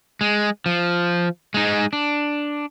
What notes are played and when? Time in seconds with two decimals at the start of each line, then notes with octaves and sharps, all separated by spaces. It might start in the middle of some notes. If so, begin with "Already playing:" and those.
0.21 G#3
0.66 F3
1.54 G#3 D#4
1.93 D4